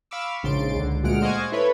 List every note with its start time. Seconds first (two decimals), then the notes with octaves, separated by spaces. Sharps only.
0.11 F5 B5 C#6 D6 E6
0.43 A#1 G#2 C#3 C6 A6 D7
0.75 C#2 D3
1.03 D2 A#2 G#3 F#5 F6 D7
1.22 C5 D#5 F5 F#5 G#5 C#6
1.52 E4 A4 B4 C#5 B5